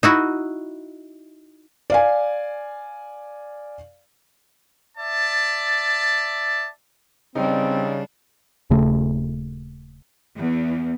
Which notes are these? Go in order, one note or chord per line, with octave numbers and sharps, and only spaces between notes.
D#4 E4 F#4
D5 F5 G#5
D5 E5 A5
C#3 G3 C4 D4 D#4
D#1 C#3 A3
E2